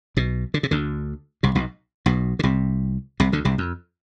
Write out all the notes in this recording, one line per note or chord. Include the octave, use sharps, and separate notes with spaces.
B1 B2
D3
C3
D2 D3
C2 C3
B1 B2
B1 B2
D3
C2 C3
C2 C3
D2 D3
C2 C3
F2